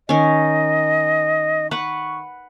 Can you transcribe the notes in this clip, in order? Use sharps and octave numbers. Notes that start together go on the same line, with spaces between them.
D#3 C#4 D#5
B4 F#5 C#6